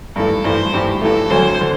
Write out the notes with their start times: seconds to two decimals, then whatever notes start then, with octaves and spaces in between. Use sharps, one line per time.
0.16 G2 E3 A3 A4
0.44 G2 E3 A3 C5
0.73 G2 E3 A3 G4
1.02 G2 E3 A3 A4
1.30 D2 D3 F#3 C5
1.61 D3